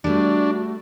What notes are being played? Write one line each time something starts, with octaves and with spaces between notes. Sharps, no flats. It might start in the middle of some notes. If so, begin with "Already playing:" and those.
G3 A3 D4 F#4